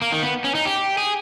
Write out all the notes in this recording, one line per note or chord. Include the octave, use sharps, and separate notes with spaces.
A#3
D#3
B3
C#4
D#4
G4
G#4